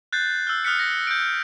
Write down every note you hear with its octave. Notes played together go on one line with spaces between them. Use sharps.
F#6 G6 A6 C7
E6 F6
D#6 F6 F#6 B6 C#7
A#6 C#7
G6 D7